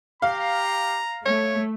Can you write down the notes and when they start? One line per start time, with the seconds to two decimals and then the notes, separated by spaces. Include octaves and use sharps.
0.22 G4 F5 A#5
1.26 A3 C#5